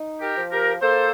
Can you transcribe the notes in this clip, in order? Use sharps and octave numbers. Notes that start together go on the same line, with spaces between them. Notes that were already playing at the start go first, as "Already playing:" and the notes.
Already playing: D#4
G4 A#4
F3
G4 A#4
A#3 A4 C5